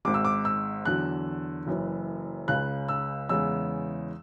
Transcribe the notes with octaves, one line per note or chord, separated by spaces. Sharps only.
G#1 G#2 G#3 D6
E6
D6
E6
E2 D3 F#3 F#6
F#1 F#2 E3
C#2 C#3 G#3 F#6
E6
E2 C#3 E3 G#3 E6